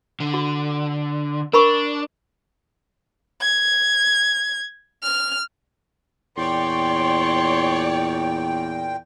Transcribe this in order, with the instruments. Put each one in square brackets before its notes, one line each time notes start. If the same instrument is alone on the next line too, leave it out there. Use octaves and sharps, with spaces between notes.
[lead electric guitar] D3
[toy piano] F#4
[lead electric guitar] D4 [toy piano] A#4 B5 C#6
[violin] G#6
F6
[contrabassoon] E2 [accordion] A#2 G5 [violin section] C#5 D5 [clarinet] C6